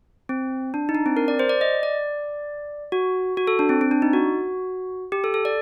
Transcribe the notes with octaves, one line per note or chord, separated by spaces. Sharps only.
C4
D4
D#4
D4
C4
A#4
D5
C5
D5
D#5
D5
F#4
F#4
A4
D4
C4
C4
D4
D#4
F#4
G4
A4
A4
D5